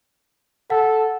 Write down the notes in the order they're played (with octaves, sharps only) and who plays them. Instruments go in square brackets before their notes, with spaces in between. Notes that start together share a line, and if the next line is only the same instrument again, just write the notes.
[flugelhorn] A4 [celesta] F#5